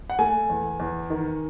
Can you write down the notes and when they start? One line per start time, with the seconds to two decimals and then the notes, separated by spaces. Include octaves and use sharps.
0.10 F#5
0.19 A3 G#5
0.50 E2
0.80 E2
1.10 D#3